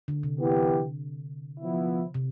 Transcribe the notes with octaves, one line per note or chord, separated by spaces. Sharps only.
D3
C3
E3 B3 E4 G4
F3 B3 E4
C3